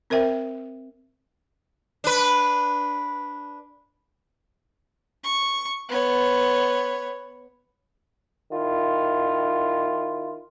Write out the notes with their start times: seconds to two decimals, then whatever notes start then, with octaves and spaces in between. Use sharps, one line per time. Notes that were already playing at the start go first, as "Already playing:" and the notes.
0.10 C4 A#4 C5 E5 G5
2.04 D4 B4
5.24 C#6
5.89 B3 C#5
8.52 D#3 E4 F4